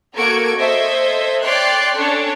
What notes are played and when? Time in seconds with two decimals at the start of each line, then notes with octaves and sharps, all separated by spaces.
0.14 A#3 F#4 A4 C#6 G#6 D7
0.58 A4 C5 D#5 E5 G#6
1.43 C#5 D5 G5 C6 F#6
1.97 C#4 D4 A4 C#5